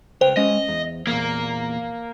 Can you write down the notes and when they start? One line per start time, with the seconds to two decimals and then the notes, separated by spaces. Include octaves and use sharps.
0.21 C#2 B4 C5 G5
0.37 G#3 C#4 D#5
0.68 E2
1.07 E2 A#2 A#3